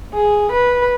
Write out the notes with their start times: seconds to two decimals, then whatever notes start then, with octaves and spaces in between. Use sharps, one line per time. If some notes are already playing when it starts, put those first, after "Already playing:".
0.14 G#4
0.52 B4